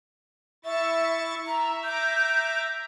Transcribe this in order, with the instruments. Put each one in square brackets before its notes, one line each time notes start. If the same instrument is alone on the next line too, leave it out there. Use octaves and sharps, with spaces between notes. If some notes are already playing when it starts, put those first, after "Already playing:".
[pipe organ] E4 C#6 A6 [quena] E5
[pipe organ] E5 [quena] A#5
[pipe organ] E5 A#5 D6 [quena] G6